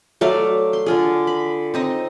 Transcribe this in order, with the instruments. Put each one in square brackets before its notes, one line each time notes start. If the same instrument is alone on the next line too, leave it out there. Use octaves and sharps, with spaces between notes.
[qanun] F#3 A3 D5 F5
C6
D3 F4 G#4
B5
C4 D#4 D#5